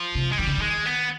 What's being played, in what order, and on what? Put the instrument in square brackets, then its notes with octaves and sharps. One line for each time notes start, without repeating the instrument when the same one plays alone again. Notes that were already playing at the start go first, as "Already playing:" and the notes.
Already playing: [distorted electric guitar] F3
[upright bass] C3
[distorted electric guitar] G#3
[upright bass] D#3 [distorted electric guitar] G3
[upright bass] D3
[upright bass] D#3 [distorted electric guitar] G#3
[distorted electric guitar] B3